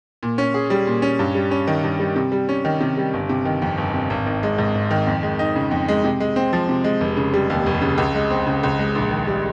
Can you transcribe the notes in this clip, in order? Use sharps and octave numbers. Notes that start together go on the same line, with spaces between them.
A#2
C#4
G#4
G3
A#2
C#4
G2
G3
C#4
D#3
G2
G3
C3
G3
C#4
D#3
C3
G3
G1
C3
D#3
F2
G1
C3
G#1
D#3
G#3
G#2
G#1
D#3
F2
G#3
D#4
C#3
F2
G#3
C3
G#3
C4
F3
C3
G#3
F1
C#3
G3
D#2
F1
C#3
C#2
G#3
C4
C#3
C#2
G#3
A#1
D#3
G3